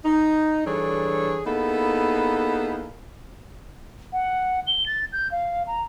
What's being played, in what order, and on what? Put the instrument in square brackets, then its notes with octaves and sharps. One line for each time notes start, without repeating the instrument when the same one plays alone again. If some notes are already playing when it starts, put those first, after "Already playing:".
[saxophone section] D#4
E3 G3 D4 G#4 A4 C#5
A#3 B3 D#4 E4 G#4 A4
[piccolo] F#5
G7
A6
G6
F5
A#5